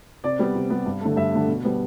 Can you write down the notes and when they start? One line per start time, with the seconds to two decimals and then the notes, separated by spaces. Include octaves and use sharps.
0.24 C3 D5
0.39 G3 B3
0.55 C3
0.70 G3 B3
0.86 G2
1.01 D3 A3
1.16 G2 E5
1.32 D3 A3
1.47 B2
1.64 G3 B3